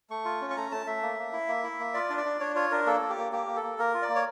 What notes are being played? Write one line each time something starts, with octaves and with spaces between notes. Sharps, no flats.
A3 C#6
F4
C#4
C#6
A3 A#5
A3 A5
A3 E5
A#3
A#3
E4
A#3
E4
A#3
F4 D5
D4
D5
D4
D4 C#5
F4 C#5
D4 A#4
A#3 A4
A#3
G4
A#3
A#3 G4
A#3
A4
A#3
A#3 A#4
F4
D5
A#3
C#5